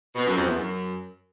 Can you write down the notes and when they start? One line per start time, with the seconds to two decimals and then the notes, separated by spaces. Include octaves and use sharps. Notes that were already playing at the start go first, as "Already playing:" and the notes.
0.15 B2
0.25 F#2
0.35 F2
0.45 E2
0.55 F#2